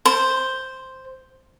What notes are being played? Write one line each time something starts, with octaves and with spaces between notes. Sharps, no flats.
C5